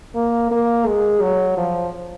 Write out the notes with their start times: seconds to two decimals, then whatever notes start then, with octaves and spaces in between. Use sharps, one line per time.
0.15 A#3
0.51 A#3
0.87 G#3
1.21 F#3
1.57 F3